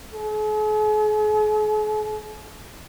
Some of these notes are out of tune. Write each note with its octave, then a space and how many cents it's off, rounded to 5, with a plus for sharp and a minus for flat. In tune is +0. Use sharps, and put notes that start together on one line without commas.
G#4 +45